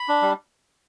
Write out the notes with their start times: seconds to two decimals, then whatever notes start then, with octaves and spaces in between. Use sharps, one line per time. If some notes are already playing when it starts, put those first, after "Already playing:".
Already playing: B5
0.08 D4
0.22 G3